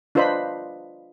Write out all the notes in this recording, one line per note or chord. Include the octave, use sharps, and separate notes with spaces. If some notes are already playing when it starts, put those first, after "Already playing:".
D4 F4 B4 C5 D#5 B5